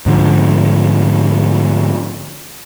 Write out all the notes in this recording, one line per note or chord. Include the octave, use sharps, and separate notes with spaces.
G#2 D3 F3